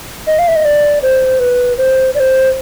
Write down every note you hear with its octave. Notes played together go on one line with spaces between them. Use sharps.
D#5
F5
E5
D#5
D5
C5
B4
C5
D5
C5